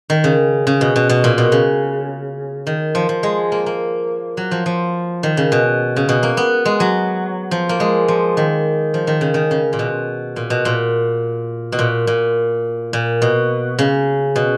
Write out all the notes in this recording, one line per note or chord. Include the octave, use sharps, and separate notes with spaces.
D#3
C#3
C#3
B2
B2
B2
A#2
B2
C#3
D#3
F3
F3
G#3
A#3
A#3
F#3
F3
F3
D#3
C#3
B2
C#3
B2
A#3
B3
G#3
F#3
F3
A#3
G#3
F3
D#3
F3
D#3
C#3
D#3
C#3
A#2
B2
A#2
B2
A#2
B2
A#2
A#2
A#2
B2
C#3
B2